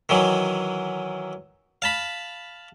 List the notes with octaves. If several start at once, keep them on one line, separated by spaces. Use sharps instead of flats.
D#3 E3 F#3
F5 A5 B5